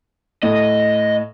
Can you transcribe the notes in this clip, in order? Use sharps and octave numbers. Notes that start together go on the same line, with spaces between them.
A2 D#5